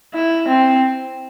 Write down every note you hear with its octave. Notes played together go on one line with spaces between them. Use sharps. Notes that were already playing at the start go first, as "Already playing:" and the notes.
E4
C4